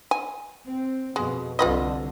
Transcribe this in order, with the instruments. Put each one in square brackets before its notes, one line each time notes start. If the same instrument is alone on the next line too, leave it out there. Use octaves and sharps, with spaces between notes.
[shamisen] G#5
[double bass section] C4
[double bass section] F2 B2 [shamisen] G#3
[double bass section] C2 D3 [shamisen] F4 B4 D#5